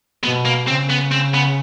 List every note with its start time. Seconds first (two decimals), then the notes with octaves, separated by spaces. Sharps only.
0.23 B2 B3
0.45 A#3
0.68 C#3 C4
0.90 B3
1.11 C4
1.34 B3